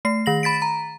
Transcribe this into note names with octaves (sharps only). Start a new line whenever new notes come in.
A3 C7
D#3 A#6 F#7
B5 A6 B6 D7
A#5